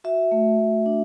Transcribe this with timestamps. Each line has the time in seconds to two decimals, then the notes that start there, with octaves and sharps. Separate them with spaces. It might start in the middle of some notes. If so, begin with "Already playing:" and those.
0.04 F#4 E5
0.32 A3
0.59 A3
0.86 D4